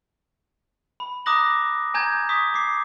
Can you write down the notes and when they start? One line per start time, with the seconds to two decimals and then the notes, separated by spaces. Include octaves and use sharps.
1.00 B5
1.26 A#5 D6 D#6 F#6 A#6 F#7
1.94 G#5 A#5 G6 G#6
2.29 C#6 D#6 B6
2.54 D6 C7